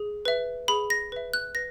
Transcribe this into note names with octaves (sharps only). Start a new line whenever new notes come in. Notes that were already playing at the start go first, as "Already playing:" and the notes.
Already playing: G#4
B4 E5
G#4 B5
A#6
B4 E5
F#6
B4 A#6